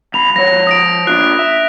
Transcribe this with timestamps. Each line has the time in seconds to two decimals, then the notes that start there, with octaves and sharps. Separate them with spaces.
0.14 B1 B5 F7
0.36 F3 C#5 A#6
0.67 D#6 A#6 D7
1.07 D4 F4 F#6
1.39 E5